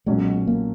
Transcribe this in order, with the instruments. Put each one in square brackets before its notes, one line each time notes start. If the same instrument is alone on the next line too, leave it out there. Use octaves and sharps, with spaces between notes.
[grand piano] B1 A#2 F#3 C#4 [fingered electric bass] G#3
[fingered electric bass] A#3